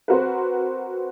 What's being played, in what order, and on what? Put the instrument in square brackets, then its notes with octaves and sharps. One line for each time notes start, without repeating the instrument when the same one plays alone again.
[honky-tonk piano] C4 F#4 A#4 B4